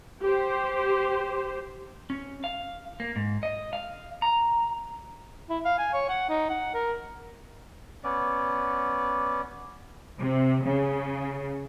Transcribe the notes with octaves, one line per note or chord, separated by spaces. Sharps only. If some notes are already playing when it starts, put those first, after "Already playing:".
G4 C5
C#4
F5
A#3
G#2
D#5
F5
A#5
E4
F5
G#5
C#5
F#5
D#4
F#5
A#4
B3 C#4 D5
C3
C#3